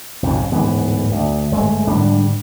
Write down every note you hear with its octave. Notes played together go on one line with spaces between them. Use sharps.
B1 F2 G#2 C#3
D1 G#2 E3 B3
D2
G1 G#3 A3
G#2 D3 G3 D4